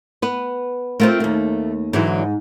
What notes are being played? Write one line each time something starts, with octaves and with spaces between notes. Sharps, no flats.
B3 B4
A3 C4 F4 A#4
D#2 A#3
G#2 D3 E3 F#3